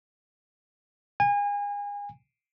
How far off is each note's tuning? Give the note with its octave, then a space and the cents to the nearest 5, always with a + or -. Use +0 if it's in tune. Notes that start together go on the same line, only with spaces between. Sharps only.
G#5 -30